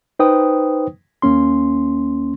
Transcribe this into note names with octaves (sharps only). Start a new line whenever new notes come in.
D#4 B4 C5 G5 D#6
D#2 A#3 C#4 C6